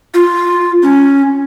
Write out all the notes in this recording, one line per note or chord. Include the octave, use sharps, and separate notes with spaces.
F4
C#4